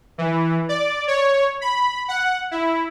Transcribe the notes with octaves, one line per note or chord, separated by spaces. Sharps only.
E3
D5
C#5
B5
F#5
E4